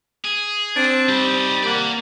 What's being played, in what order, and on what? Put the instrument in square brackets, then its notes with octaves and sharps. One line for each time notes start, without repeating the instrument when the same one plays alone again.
[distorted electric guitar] G#4
[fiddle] C4 [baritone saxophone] D4
[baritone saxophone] G3 [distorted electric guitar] D#4 D5
[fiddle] A#3 [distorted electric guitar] D5 F#5